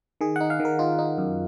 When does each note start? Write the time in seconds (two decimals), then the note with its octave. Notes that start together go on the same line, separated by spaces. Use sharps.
0.21 D#3 G#4
0.36 D#4 F#5
0.50 F5
0.60 D#3
0.65 A#4
0.79 D#4 F4
0.99 D#4
1.18 F#2